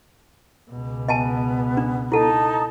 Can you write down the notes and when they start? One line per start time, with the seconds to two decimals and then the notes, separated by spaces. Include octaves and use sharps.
0.70 C#2 B2
1.08 B3 D#5 G#5 A5
1.77 D4
2.12 D#4 E4 A4 A5